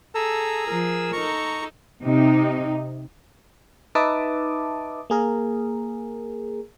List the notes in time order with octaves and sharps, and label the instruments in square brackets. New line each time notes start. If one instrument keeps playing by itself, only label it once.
[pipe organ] G#4 E6 [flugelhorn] A4 [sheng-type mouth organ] A#5
[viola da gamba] F3 [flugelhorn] A#4
[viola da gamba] D#4 A4 [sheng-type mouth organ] A#5 C#6
[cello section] C3 D#4
[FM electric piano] D#4 B4 E5 A5 D6 D#6
A#3 G#4 A#4